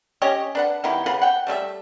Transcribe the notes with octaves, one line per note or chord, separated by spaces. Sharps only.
C#4 G4 C#5 D#5
D4 B4 F#5
D#3 B3 E4 G4
C#3 F4 B4 F#5
F#5 G5
G3 A3 A4 E5